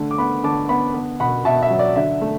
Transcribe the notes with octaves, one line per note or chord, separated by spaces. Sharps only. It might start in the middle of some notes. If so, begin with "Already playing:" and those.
Already playing: D3 A3
D6
B3 F#5 B5
D3 A5 D6
B3 F#5 B5
B3
B2 F#5 B5
B2 E5 A5
E5
F#3
D5
D3 E5
A3